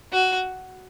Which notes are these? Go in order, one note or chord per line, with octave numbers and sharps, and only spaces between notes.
F#4